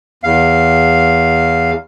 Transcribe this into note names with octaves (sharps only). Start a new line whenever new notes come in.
E2 F5